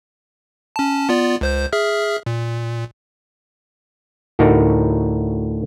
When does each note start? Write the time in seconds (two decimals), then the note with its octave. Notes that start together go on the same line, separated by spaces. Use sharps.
0.76 C#4 A5
1.09 B3 F4 D5
1.41 C#2 C5 G6
1.73 G#4 E5 F6
2.26 A#2
4.39 D2 A2 D#4 F#4 A#4